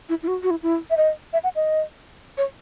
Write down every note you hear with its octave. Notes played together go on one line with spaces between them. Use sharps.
E4
E4
F#4
F#4
E4
E4
E5
D#5
E5
F#5
D#5
C#5